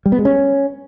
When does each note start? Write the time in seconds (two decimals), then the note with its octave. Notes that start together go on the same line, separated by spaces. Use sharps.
0.06 G3
0.12 B3
0.19 G#3
0.25 C#4